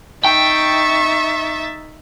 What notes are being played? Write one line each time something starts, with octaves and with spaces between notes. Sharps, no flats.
D#4 E5 G5 C#6 A6